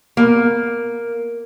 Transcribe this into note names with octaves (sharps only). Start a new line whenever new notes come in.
A#3